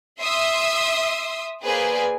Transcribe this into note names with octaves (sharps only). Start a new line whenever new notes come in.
E5 C6 D#6 E6
A#3 G#4 B4 C5 D5 G#5